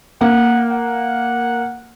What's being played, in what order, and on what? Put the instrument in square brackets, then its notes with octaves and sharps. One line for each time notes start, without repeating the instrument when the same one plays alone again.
[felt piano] A#3 [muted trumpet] F#5
[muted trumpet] F#5